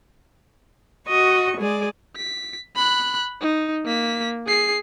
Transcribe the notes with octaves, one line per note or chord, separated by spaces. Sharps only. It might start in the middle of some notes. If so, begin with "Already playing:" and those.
F#4 D#5 C#6
G#3 G#4 D5
B6
B5 F#6
D#4
A#3 B6
G#4 C7